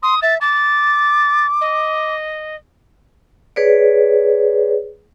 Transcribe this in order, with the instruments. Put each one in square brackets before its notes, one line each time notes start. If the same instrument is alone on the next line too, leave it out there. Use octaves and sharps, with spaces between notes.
[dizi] C6 [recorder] D#6
[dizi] E5 [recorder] A6
[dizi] D6 [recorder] A6
[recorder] D#5
[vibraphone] G#4 B4 C#5 D5